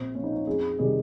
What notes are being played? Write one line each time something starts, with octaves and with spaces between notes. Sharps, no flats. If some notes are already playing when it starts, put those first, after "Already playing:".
Already playing: A#1 C4
A#2 F3 C#4
D#4
C#4
F2 G#4
C3 D#3 G3 G#4